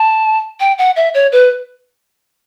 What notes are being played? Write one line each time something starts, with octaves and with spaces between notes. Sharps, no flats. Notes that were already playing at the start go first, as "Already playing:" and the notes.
Already playing: A5
G5
F#5
E5
C#5
B4